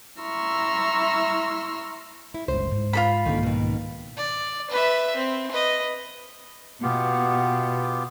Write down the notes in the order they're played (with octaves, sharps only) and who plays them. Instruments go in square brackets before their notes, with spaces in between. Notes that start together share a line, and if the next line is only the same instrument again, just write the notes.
[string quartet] E4 A#5 C6 C#6 E6 F6
[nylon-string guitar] E4
[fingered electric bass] G1 C#2 [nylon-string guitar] C5
[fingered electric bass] G#2
[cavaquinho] F4 A4 B5
[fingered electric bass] C2 G#2 A#3 [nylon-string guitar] D3 D#3
[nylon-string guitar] B2 D#3
[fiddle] D5
B4 E5
C4
B4 D#5
[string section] B2 [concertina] B3 F4 G4